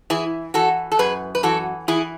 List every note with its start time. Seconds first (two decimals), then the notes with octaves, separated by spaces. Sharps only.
0.10 E3 E4 G#4
0.54 E3 F#4 A4
0.92 A4
0.99 F#2 G#4 B4
1.35 B4
1.43 E3 F#4 A4
1.88 E3 E4 G#4